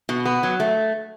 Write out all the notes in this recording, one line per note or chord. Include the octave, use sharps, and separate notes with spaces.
B2
B3
F#3
A3